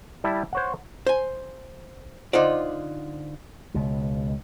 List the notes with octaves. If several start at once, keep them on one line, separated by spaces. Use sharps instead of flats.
G3 E4 A5
C5 C#5 F#5
C5 G#5
D3 D#4 F4 C5 D5
C#2 B2